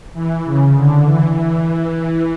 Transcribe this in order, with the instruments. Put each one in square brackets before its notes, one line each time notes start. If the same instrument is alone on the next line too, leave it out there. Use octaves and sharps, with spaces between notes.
[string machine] E3
C#3
D3
E3
E3